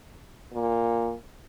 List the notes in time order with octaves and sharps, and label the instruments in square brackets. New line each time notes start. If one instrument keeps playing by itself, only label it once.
[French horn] A#2